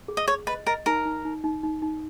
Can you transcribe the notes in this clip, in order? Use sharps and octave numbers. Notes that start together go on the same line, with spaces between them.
G#4
D#5
G#4 C#5
B4 D#5
A#4 D#5
D#4 A#4
D#4
D#4
D#4
D#4
D#4